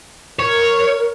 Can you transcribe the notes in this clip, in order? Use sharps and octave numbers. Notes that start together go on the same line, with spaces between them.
A#4 C#5